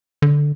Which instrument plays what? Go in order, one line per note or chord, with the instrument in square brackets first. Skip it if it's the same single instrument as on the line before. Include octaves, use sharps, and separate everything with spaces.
[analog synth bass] D3